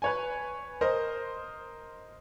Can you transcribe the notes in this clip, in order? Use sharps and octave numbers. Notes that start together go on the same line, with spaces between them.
B4 C#5 G#5
A#4 C5 D#5